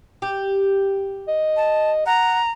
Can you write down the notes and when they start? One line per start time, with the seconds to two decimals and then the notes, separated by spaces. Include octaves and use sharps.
0.22 G4
1.28 D#5
1.57 A5
2.06 F#5 A#5